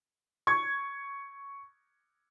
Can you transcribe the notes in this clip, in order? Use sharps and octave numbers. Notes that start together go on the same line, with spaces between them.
C#6 G#6